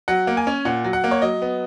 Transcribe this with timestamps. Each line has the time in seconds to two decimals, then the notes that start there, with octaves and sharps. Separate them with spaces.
0.08 F#3 F#5
0.27 A#3
0.37 G#5
0.47 C#4
0.65 A#2 F#5
0.84 F#3
0.93 F#5
1.04 A#3
1.11 C#5
1.22 F#3 D#5
1.42 B3